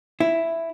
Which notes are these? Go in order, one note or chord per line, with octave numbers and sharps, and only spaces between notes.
E4